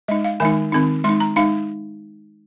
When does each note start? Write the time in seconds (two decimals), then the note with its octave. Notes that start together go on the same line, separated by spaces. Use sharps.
0.08 G#3 D#4 D#5
0.24 F5
0.40 D#3 G#3 D#4 G#5
0.72 D#3 C4 D#4
1.04 G#3 D#4 C6
1.20 A#5
1.36 G#3 D#4 F5